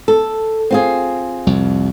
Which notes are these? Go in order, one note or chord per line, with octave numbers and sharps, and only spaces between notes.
A4
C4 F4 G#4
C2 F2